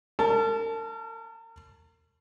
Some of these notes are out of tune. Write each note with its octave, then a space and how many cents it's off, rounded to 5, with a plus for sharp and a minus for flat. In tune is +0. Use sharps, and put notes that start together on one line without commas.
A#4 -40 A5 -10